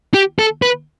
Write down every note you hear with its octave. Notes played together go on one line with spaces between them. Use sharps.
G4
A4
B4